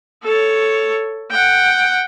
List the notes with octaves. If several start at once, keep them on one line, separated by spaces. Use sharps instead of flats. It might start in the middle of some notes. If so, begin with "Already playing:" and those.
A4 C#5
F#5 G5